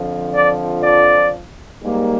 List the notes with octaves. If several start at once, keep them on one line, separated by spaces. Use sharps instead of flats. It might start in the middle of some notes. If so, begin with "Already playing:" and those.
Already playing: F2 D3 F3
D5
D5
G#2 G3 A#3